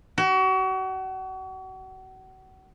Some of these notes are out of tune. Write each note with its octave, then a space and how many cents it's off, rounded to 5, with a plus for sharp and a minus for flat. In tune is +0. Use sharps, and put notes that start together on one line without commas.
F#4 +35